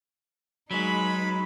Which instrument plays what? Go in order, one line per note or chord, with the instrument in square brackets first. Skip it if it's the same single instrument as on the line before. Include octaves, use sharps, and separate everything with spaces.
[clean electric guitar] F#3 [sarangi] G#3 [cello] D#4 B4 [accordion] B5